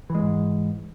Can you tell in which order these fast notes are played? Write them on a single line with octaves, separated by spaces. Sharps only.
E3 G#3 G#2